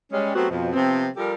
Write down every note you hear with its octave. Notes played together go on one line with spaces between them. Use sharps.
G3 G#3 C#4
F#3 A3 B3 C4 F#4 G4
F2 B2 F3
C3 F3 B3 C4
F3 G3 G4 A4 A#4